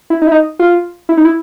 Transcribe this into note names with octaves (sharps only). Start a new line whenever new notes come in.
E4
D#4
E4
D#4
F4
E4
D#4
E4